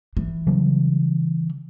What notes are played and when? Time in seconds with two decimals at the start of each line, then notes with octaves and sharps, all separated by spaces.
0.17 E3
0.47 C#3 F#3 G3